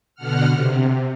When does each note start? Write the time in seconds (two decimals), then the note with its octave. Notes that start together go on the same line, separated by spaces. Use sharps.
0.15 B2 D3 F#5 F6
0.49 C3